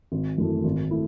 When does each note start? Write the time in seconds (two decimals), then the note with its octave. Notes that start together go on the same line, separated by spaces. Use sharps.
0.12 G#1
0.38 F#2 E3 A3
0.64 G#1
0.91 A3 E4